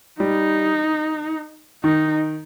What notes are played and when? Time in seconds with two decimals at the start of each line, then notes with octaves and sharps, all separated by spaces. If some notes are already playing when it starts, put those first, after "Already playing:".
0.20 G3 D#4
1.84 D#3 D#4